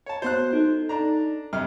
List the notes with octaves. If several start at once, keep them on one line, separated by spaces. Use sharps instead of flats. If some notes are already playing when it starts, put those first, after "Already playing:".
C#5 A5
B3 F#4 C5 C6 F#6
D#4 A4
D4 A#5
G2 C3 F6